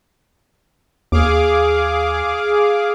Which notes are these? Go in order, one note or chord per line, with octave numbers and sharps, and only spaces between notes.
D#2 G#4 F5 D6